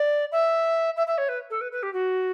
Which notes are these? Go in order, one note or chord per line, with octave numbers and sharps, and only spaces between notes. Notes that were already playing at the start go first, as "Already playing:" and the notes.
Already playing: D5
E5
E5
E5
C#5
B4
A4
B4
B4
G4
F#4